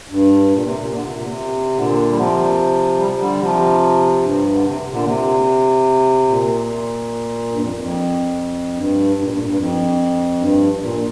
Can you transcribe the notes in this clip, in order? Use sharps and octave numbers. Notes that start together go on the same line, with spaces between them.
G2
A#2
C3
A#2
D3
C3
A#2
C3
A#2 D3
G3
C3 F3
G3
D3 G3
C3 F3
G2
D3
C3
A#2 D3
C3
A#2
G2
F2
F2
G2
G2
A#2
G2
A#2
G2
F2
G2
G2
A#2